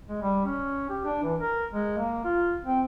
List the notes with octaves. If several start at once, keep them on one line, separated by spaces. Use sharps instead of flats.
G#3
G3
C#4
G4
D4
E3
A#4
G#3
A#3
F4
C4